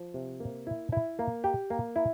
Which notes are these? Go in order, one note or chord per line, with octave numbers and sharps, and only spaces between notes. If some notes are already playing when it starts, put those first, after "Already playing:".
Already playing: F3
C3
A#3
E4
E4
A#3
G4
A#3
E4